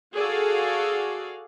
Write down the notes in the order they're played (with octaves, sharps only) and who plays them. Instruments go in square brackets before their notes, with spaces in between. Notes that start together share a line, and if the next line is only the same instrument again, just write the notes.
[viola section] F#4 G#4 A4 D5 F5